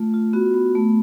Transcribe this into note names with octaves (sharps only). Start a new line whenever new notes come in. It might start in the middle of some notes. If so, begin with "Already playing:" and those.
Already playing: A3 F4
F4
B3 F#4
B3
A3